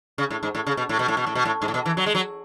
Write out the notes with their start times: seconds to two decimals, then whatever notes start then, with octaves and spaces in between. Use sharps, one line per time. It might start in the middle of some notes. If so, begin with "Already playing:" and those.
0.18 C#3
0.31 A2
0.43 G#2
0.55 A2
0.67 C#3
0.77 B2
0.89 A2
0.99 B2
1.08 A2
1.17 B2
1.27 A2
1.35 B2
1.45 A2
1.62 G#2
1.68 A2
1.74 B2
1.86 E3
1.97 F#3
2.06 G#3
2.15 F#3